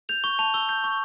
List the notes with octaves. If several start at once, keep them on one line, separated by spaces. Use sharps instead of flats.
G6 F7
C#6 G7
A5 F7
E6 G7
G6
C#6